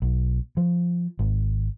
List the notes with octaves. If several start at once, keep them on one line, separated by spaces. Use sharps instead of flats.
B1
F3
G#1